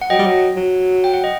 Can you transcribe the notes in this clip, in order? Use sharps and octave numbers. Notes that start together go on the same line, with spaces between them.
F#5
F#3 D#5 G5
G3
F#3
F#3
G5
F#5
D#5